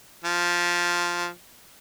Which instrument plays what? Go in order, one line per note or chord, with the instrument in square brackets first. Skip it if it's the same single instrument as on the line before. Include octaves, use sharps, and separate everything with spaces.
[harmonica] F3